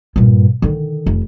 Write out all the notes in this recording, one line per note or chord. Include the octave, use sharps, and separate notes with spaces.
G2 A#2
D3 D#3
F1